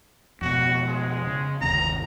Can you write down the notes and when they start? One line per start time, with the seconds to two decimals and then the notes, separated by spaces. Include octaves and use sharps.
0.41 F2 B2 F#4
0.87 G#3
1.27 C#3
1.61 G1 D#2 C3 A#5